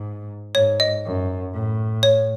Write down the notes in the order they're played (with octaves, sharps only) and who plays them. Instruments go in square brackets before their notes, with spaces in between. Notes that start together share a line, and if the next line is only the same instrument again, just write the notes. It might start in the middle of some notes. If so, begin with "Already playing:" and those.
Already playing: [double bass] G#2
[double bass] G#2 [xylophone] C#5
[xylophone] D#5
[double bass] F#2
A2
[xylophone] C#5